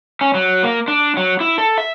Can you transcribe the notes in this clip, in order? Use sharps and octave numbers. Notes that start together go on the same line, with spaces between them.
C#4
F#3
A#3
D4
F#3
E4
A4
E5